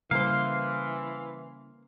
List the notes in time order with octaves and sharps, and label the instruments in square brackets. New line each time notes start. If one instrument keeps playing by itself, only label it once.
[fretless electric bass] C#3 G3 [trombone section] E3 [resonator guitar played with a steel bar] A#3 C5 [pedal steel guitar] F5